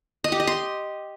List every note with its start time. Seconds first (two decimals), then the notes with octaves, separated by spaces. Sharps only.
0.24 D#5
0.32 G4
0.40 D#5
0.47 C6